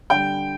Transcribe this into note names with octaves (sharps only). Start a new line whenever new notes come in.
D3 G3 G5